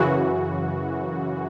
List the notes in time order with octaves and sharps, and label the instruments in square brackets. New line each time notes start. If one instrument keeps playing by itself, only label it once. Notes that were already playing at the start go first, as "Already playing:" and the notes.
Already playing: [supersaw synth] F#2 C#3 E3 F#4